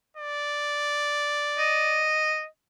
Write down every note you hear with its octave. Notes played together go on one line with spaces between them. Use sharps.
D5
D#5